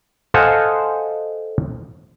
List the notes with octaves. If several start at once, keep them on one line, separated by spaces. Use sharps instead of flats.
A4 C5 D#5 F5 F#5 G#5